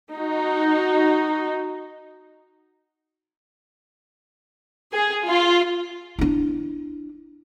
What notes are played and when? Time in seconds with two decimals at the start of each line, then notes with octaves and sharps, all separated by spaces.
0.11 D#4 F#4
4.92 G#4
5.25 F4
6.19 D4 E4